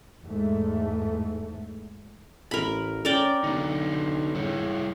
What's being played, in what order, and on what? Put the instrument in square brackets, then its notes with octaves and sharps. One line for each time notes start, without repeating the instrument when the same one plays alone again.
[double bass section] E2 G#2 A3
[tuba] A1 [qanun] A#4 B5
[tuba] C#4 [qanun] A#4 D5 G5
[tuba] D3 [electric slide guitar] B3 D#4
[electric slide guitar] G3 E4 C#5